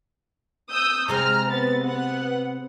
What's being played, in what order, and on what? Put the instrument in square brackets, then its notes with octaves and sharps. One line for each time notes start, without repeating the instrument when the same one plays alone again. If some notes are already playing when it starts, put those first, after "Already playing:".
[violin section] D#6 E6 G6
[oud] C3 G#3 C4 [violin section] A#5 F6
[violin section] B3 A6
B3 F#5